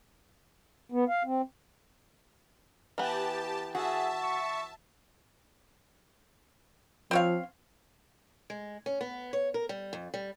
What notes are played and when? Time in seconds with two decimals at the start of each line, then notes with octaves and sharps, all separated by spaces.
0.92 B3
1.09 F5
1.25 C4
2.98 E3 B3 G4 A5
3.75 F#4 G#4 E5 A5
4.23 C#6
7.11 F3 C4 C#5 F5
8.50 G#3
8.86 C#4
9.01 B3
9.33 C#5
9.54 A#4
9.69 G3
9.93 F2
10.14 G3